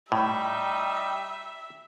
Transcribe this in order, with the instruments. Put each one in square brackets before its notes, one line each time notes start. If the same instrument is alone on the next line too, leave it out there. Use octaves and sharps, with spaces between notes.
[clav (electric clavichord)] A2 [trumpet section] G3 D#4 [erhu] E5 [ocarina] G5